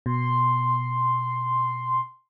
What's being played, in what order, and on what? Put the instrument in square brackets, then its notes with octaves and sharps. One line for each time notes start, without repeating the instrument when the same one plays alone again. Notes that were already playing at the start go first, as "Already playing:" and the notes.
[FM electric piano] B2 [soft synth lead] C6